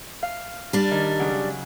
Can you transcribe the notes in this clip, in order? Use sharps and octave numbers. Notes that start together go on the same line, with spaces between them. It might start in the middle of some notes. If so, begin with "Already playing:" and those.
F5
G3 D4
D#3
C#3 F#3